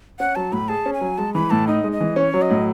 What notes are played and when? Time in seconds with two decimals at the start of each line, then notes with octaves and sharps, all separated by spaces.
0.19 C#4 F#5
0.35 F#3 A5
0.52 A2 B5
0.68 G#4 A5
0.86 C#4
0.94 G#5
1.01 F#3
1.18 G#3 A5
1.34 E3 B5
1.50 A2 A5
1.67 D#4 D#5
1.84 G#3
1.92 D#5
2.01 E3
2.16 C#4 C#5
2.34 F#3
2.42 D#5
2.50 A2